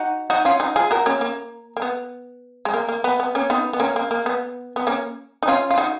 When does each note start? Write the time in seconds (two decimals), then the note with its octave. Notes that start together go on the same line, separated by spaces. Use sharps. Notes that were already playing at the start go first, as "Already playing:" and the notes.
Already playing: D#4 F#4
0.30 D#4 F#4
0.45 C#4 F4
0.60 D#4 F#4
0.76 F4 G#4
0.91 F#4 A#4
1.06 A#3 C#4
1.21 A#3
1.77 A#3
1.82 B3
2.65 G#3
2.74 A#3
2.89 A#3
3.04 B3
3.20 B3
3.35 A#3 C#4
3.50 B3 D#4
3.73 B3
3.80 A#3 C#4
3.96 A#3
4.11 A#3
4.26 B3
4.76 B3
4.87 A#3 C#4
5.43 D#4
5.48 C#4 F4
5.70 F4
5.78 D#4 F#4